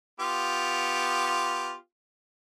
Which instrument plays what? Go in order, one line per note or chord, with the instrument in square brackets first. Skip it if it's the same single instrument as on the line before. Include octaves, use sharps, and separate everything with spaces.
[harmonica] B3 F4 G4